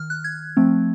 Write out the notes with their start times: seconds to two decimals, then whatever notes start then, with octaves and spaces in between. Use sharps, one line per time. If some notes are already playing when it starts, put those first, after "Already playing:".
Already playing: D#3 F6
0.10 F#6
0.24 G#6
0.57 F3 A3 C4